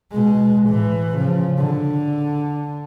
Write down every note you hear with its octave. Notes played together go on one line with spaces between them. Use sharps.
B2 G#3
A2 E3
C#3 F3
D3